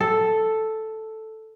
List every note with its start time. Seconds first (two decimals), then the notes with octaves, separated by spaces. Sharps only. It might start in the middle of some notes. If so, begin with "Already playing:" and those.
0.01 A4